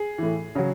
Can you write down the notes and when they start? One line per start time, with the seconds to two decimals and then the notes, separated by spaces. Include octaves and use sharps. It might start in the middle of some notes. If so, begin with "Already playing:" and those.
Already playing: G#4
0.18 A2 E3
0.55 C#3 F#3